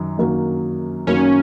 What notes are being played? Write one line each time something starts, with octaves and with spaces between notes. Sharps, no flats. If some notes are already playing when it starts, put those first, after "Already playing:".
Already playing: F#2 D#3 F#3
F#2 D#3 F#3 A#3
F#2 D#3 F#3 A#3 C#4